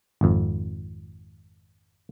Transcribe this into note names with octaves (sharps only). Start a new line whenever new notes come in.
G#1 F2